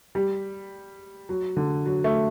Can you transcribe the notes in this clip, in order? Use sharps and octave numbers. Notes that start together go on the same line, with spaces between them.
G3
F#3
D3
F#3
A3